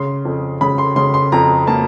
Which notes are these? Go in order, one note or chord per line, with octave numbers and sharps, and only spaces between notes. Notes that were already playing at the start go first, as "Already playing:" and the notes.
Already playing: C#3 C6
F2
C#3 B5
C6
C#3 C6
C6
F2 A#5
A#3 A5